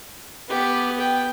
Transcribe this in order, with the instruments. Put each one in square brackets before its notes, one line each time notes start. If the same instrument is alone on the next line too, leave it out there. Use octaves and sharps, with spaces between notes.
[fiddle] B3 [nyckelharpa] G4
[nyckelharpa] G5